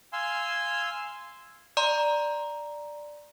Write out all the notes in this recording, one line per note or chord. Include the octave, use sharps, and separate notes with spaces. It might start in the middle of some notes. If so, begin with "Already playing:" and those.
F5 G#5 C6 E6
D5 A#5 C6